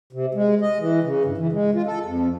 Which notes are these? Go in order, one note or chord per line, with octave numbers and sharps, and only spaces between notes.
C3
G#3
D#5
E3
C#3
G2
E3
G#3
F4
A4
F2